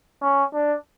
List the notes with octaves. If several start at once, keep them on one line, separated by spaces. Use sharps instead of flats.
C#4
D4